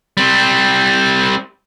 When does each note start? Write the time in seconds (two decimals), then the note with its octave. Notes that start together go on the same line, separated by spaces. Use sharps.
0.17 G3 C4